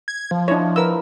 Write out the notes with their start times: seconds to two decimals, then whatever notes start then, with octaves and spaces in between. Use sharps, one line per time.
0.08 G#6
0.31 F3
0.48 D4 E4 C#5 D#5
0.76 A#4 B4 C#5 F#5 E6